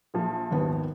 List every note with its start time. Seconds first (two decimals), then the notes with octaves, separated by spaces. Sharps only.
0.14 A#1 F3
0.51 G#1 D#2 B3